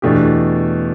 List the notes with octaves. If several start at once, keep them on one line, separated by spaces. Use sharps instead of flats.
E2 B2 A3 D4 G4